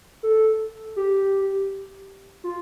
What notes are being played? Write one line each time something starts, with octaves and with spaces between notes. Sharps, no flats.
A4
G4
F4